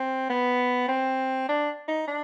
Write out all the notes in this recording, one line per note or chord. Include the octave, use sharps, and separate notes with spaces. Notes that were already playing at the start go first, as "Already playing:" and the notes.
Already playing: C4
B3
C4
D4
D#4
D4